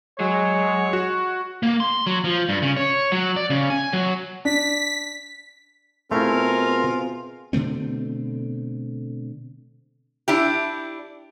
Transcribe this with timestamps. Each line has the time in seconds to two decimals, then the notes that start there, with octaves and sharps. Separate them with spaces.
0.20 F#3 G#3 C#5
0.93 F#4
1.63 A#3
1.80 C6
2.07 F#3
2.24 F3
2.49 G2
2.62 C#3
2.77 C#5
3.12 F#3
3.36 D5
3.50 C#3
3.70 G#5
3.93 F#3
4.45 D4 B6
6.11 B2 A3 C4 E4 F4 G#4 A#4
7.53 B2 D3 A3 C4
10.28 D4 E4 G4